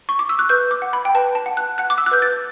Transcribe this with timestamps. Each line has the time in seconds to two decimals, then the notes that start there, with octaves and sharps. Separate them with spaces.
0.09 C#6
0.19 D6
0.29 E6
0.39 F#6
0.49 B4 G6
0.71 D6
0.82 F#5
0.93 B5
1.05 G5
1.15 B4 A5
1.35 A5
1.46 F#5
1.57 F#6
1.78 F#5 F#6
1.90 D6
1.98 E6
2.06 F#6
2.11 B4 G6
2.22 A6